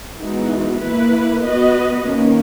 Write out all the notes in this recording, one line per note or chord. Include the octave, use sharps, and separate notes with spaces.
E3 G#3 B3 D#4 F#4
A#3 E4 B4
B3 F#4 B4 D#5
D#3 A#3 C#4